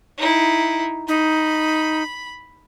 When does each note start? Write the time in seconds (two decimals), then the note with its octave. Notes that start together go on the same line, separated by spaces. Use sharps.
0.18 D#4 E4
1.08 D#4 B5